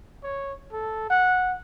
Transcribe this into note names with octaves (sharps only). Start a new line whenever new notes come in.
C#5
A4
F#5